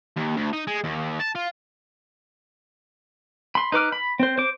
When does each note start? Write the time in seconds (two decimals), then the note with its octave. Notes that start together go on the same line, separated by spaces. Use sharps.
0.17 D#2
0.37 D2
0.53 D#4
0.67 G#3
0.84 D#2
1.20 A5
1.35 F4
3.55 B5 C6
3.72 D#4 B4 D6 F6
3.92 B5
4.20 C4 C5
4.38 C5 D6